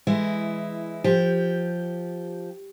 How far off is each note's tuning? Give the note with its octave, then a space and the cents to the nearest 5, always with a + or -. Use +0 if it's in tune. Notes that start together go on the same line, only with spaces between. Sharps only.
E3 +15 G#3 +0 E4 +0
F3 +0 G4 +0